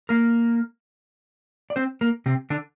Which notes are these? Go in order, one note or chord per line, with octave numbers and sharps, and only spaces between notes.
A#3 A#4
D5
C4 C5
A#3 A#4
C3 C4
D3 D4